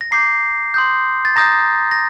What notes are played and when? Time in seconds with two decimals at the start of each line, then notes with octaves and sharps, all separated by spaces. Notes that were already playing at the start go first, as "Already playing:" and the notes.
0.01 A#6
0.11 A#5 D6 G6 C7
0.74 C6 D#6 G6
1.25 A6
1.36 A#5 D#6 G6 A#6
1.91 A#6